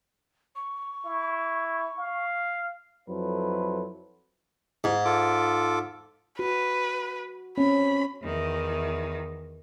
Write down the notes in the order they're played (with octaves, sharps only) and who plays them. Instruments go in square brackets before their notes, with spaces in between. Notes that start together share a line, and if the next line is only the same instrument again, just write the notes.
[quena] C#6
[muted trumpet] E4
F5
[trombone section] F2 F#3 E4 A4 B4 C5
[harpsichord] G#2
[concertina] F4 A4 D6
[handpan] F#4 [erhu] B4
[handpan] C4 C#4 [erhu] B5
[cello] E2 D#3